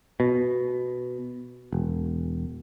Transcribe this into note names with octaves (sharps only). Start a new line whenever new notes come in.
B2
E1